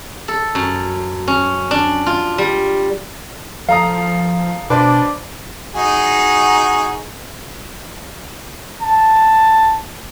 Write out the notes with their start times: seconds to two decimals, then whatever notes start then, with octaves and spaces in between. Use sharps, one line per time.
0.28 A4
0.55 F#2
1.28 C#4
1.71 D4
2.06 F4
2.38 G3
3.69 F3 A4 F5 A#5 D#6
4.70 B2 D4 B4 C5 D5
5.75 D#4 F#4 G#4
8.82 A5